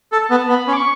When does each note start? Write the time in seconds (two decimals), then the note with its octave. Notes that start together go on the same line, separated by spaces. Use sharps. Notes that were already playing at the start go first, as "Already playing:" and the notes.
0.12 A4
0.21 A5
0.30 B3
0.49 B3 B5
0.68 C#4
0.73 D6
0.77 C#6